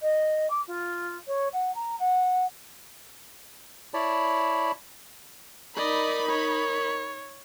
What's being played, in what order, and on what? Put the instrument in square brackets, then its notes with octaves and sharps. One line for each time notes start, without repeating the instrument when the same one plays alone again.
[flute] D#5
D6
F4
C#5
F#5
A#5
F#5
[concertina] E4 C#5 D5 A5 B5
[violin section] D#4 B5 [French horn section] A#4 [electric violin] D5 D#5
[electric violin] C#5